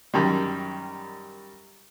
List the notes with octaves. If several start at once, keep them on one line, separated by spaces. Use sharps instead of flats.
F#2 D#3 G3